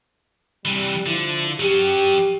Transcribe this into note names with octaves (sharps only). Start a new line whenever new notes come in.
C3 E3 G3
D3 F3 E4
F#3 C#4 G4